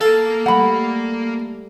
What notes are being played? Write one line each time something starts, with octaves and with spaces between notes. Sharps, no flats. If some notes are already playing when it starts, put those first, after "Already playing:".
A#3 A4 F5
G3 A3 F#5 B5